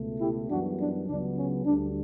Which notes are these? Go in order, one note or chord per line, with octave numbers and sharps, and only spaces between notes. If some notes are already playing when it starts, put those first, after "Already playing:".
Already playing: C#2 B2 A3
E4 G4
F#2 E3 G3 B3 D4 F#4
D4
C#2 C#3 F#3 B3 D4
C#4
D2 D3 G3 D4